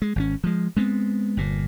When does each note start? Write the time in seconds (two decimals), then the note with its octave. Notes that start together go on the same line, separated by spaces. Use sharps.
0.02 G#3
0.16 G#1 D3 C#4
0.44 F3 G#3
0.77 G#3 B3 C4
1.37 G1 A#2